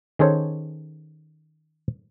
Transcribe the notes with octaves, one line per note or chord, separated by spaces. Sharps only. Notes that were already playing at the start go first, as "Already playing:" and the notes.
D#3 C#4 G#4 A4 C5 C#5